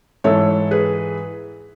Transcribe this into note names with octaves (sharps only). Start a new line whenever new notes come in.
G#2 E3 A4 C#5
G#4 B4